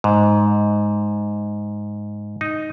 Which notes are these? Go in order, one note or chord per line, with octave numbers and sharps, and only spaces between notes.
G#2
D#4